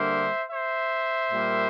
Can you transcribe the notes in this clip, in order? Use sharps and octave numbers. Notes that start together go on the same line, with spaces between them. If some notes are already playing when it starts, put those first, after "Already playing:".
Already playing: D3 G3 A#3 C5 E5
C5 E5
A#2 G3 A#3